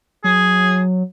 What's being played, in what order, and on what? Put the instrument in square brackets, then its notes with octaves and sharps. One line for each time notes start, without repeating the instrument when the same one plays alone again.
[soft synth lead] F#3 [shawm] G#4